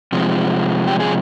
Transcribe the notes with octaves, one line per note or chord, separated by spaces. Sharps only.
C3 F3 G#3
G4
G#4